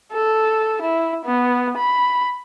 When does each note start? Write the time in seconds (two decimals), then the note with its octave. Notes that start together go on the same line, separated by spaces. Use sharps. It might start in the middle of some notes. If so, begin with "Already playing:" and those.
0.12 A4
0.81 E4
1.25 B3
1.77 B5